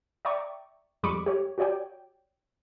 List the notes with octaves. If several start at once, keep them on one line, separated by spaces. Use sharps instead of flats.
D5 E5 G5 A#5 C#6 D6
F2 G3 G#3 B5 C#6 D6
G4 C#5
F#4 G4 C#5 D5 G5